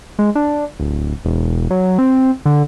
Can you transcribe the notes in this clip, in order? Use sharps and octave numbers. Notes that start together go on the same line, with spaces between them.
G#3
D4
D1
E1
F#3
C4
D3